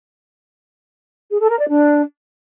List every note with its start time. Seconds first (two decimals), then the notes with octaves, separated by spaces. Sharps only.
1.30 G#4
1.40 A4
1.49 A#4
1.59 D5
1.69 D4